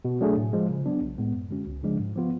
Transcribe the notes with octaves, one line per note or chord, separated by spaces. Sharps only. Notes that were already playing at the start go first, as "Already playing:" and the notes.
B2
F#3 A3 D4 G#4
A2
F3 G#3
C#3
F#3 B3 D4
B1
A2 G#3 B3
F#2
D3 G#3 C#4 F#4
C#2
C#3 F3 G#3 D4
G#2
F3 B3 F4